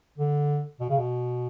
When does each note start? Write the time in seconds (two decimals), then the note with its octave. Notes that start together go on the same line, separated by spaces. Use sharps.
0.18 D3
0.80 B2
0.89 C#3
0.98 B2